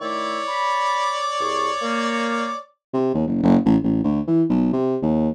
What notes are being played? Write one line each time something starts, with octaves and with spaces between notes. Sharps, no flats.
D#3 A3 E4 C#5 D5 D6
B5
C2 G#4 C#6
A#3
C3
D#2
F#1
F#1
A1
A1
D2
E3
B1
C3
D#2